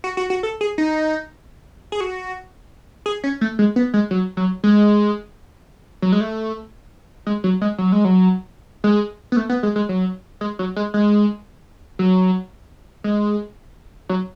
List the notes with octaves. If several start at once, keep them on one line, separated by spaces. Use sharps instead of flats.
F#4
F#4
F#4
A4
G#4
D#4
G#4
F#4
G#4
C#4
A3
G#3
B3
G#3
F#3
F#3
G#3
F#3
G#3
A3
G#3
F#3
G#3
F#3
G#3
F#3
G#3
B3
A3
B3
G#3
G#3
F#3
G#3
F#3
G#3
G#3
F#3
G#3
F#3